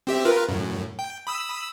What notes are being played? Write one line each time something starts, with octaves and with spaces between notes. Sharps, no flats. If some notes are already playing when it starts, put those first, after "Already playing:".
C4 G4 E5
F4 A#4 B4
F#2 A2
G5
B5 D#6 E6